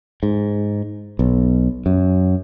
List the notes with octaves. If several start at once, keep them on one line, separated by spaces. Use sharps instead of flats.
G#2
B1
F#2